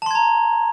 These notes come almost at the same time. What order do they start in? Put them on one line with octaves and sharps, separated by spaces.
A5 C6 G#6 A#5